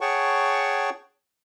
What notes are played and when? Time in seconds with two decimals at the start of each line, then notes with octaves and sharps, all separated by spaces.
0.01 G#4 C#5 F#5 G5 A5 C#6